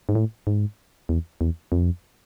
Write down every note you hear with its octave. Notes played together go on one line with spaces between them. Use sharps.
G#2
A2
G#2
E2
E2
F2